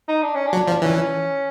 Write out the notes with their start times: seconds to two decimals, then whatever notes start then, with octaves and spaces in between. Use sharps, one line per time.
0.08 D#4
0.23 D4
0.35 C#4
0.47 D4
0.53 F#3
0.68 F3
0.82 E3 C#4